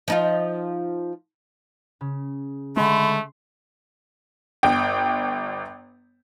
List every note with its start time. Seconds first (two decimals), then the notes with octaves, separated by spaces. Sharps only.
0.08 F3 D#4 F4
2.01 C#3
2.77 D3 G#3 A3 B5 C6
4.63 G1 G5